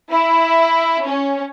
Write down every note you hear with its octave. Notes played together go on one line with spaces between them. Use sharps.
E4
C#4